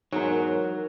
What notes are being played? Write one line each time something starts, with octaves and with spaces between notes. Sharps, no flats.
E2 G#2 F#3 D#4 A#4 C#5